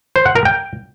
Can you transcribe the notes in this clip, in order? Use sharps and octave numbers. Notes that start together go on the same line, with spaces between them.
C5
F#5
A#4
G5